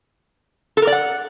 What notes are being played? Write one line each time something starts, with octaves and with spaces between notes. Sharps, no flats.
A4
A#4
D5
F#5